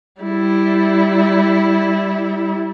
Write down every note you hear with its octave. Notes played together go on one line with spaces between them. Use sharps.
G3 E4